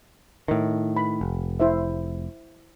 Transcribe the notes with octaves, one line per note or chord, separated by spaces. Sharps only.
A2 D#3
B5
F1
E4 C5 E5